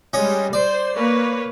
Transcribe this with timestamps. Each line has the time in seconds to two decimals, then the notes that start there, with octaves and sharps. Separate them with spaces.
0.13 G3 G#3 C#4 D#5
0.53 C5 D5
0.95 A#3 B4 C#5